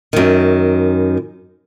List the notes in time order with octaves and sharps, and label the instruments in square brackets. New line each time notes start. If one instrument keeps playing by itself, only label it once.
[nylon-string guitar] F#2 D#3